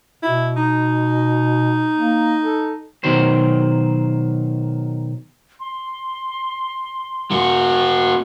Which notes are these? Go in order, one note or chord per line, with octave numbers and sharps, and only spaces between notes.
B2 E4
D#4
A#3
A4
B2 D#3 F#3 C5
C6
A#3 F#4